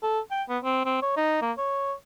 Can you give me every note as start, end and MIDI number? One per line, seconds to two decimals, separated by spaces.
0.03 0.20 69
0.31 0.43 79
0.49 0.58 59
0.64 0.85 60
0.86 1.02 60
1.02 1.16 73
1.16 1.38 63
1.42 1.52 58
1.58 1.93 73